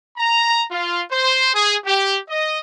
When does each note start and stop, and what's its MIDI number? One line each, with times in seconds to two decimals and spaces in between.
0.18 0.63 82
0.71 1.03 65
1.11 1.50 72
1.54 1.76 68
1.85 2.18 67
2.29 2.60 75